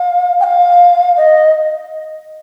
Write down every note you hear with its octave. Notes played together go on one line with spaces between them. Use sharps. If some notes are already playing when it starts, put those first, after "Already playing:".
Already playing: F5
G5
F5
D#5